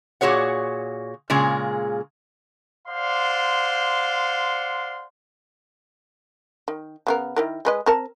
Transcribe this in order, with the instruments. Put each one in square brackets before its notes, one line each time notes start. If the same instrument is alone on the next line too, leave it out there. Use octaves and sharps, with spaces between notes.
[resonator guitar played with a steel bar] A#2 F#4 G#4 C#5 F#5
A#2 C#3 G#3 G#4
[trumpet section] C5 D5 F5 F#5 C6
[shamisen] D#3
C#3 B3 A#4
D#3 E4 A#4
G#3 B4 D#5
C4 A#4 A5